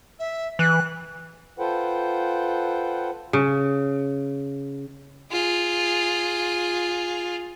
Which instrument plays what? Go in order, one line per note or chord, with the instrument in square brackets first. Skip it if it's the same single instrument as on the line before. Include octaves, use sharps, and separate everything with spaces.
[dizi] E5
[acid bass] E3 [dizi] F#6
[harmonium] F4 A4 B4 C5 F#5 G5
[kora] C#3
[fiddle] F4 G#4